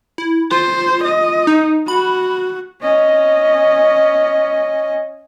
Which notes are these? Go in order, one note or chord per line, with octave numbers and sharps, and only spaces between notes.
E4
F4 C5
D#5
D#4
F#4 B5
C#4 D#5